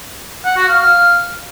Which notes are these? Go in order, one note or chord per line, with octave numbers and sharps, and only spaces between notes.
F#5
F#4
F5
F5